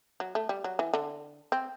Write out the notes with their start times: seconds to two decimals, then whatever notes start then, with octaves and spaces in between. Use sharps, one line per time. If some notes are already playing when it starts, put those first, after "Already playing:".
0.20 F#3
0.35 A3
0.49 G3
0.64 F#3
0.79 E3
0.94 D3
1.52 C4